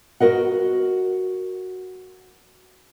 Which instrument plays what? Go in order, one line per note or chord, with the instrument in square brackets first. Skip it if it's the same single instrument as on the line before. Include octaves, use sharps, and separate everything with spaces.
[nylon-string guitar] F#4 G4 A#4 D#5 F#5